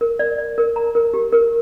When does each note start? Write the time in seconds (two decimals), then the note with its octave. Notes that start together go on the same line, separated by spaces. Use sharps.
0.01 A#4
0.19 D5
0.38 D5
0.58 A#4
0.76 A#5
0.95 A#4
1.14 G4
1.32 A#4